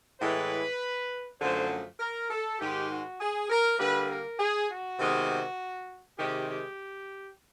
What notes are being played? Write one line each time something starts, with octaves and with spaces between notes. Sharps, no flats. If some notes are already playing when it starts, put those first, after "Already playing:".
A2 E3 G#3 B4
F#2 D3 F3 A3 C5
A#4
A4
G#2 D#3 G#3 G4
F#4
G#4
A#4
D3 G3 A#3 B4
A#4
G#4
F#4
C3 D#3 G#3 B3
C3 D#3 G#3 G4
G4